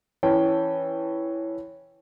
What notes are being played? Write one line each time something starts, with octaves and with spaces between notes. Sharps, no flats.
E3 C#4 G5 A5